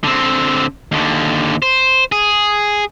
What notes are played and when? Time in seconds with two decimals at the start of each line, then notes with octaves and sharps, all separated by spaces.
0.04 D3 C4
0.92 D#2 D3
1.62 C5
2.12 G#4